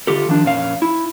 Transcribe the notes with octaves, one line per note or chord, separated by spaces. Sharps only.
D3 F4 G4 A4
D#3 F3 D4
F2 A#2 C#4 F5
E4